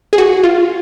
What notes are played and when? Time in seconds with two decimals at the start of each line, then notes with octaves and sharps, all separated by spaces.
0.13 G#4
0.18 F#4
0.43 F4